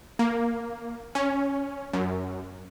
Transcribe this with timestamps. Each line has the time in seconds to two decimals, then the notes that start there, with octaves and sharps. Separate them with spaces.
0.19 A#3
1.15 C#4
1.93 F#2